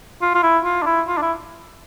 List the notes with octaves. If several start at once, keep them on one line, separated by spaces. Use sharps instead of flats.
F4
F4
E4
F4
D4
E4
F4
D4
E4